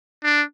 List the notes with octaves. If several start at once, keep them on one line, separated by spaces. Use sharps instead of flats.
D4